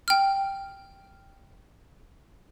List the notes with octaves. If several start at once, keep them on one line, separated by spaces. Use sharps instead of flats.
G5 F6